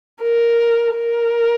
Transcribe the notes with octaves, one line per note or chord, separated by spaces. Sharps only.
A#4
A#4